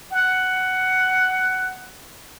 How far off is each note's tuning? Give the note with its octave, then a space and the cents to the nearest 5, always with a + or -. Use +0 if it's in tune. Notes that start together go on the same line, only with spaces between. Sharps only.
F#5 +10